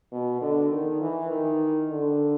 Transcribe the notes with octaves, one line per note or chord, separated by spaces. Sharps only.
B2
D3
D#3
E3
D#3
D3